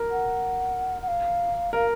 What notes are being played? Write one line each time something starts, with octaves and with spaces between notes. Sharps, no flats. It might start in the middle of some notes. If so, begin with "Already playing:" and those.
Already playing: A#4
F#5
F#5
F5
A#4 F5